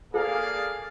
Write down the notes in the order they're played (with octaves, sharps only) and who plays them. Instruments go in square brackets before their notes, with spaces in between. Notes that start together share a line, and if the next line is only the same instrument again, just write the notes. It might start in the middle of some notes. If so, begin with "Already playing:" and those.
[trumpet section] A#3 D5 F5 [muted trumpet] G#4 [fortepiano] A4